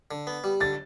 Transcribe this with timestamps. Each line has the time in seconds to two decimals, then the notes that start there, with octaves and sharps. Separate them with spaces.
0.11 D3
0.27 B3
0.44 G3
0.61 D3 A6